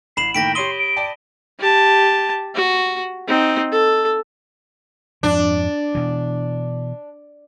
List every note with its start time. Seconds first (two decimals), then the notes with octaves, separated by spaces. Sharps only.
0.17 A1 B5 C7 E7 F#7
0.35 A2 D#3 A#3 G5 A#6 B6 D7
0.55 G4 C#5 C6 D#6 D#7 G7
0.79 D7
0.96 D5 G5 A5
1.59 G4 A5
2.55 F#4
3.28 C4 D#4
3.72 A4
5.23 F2 G#2 F3 D4
5.95 B2 E3